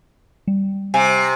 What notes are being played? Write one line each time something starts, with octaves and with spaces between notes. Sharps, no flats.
G3
C3 G#5